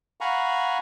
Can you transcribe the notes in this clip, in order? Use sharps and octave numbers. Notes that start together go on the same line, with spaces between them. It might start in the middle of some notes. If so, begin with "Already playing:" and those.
F5 F#5 G#5 A#5 B5 C#6